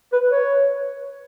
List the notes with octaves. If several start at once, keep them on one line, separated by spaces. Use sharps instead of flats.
B4
C#5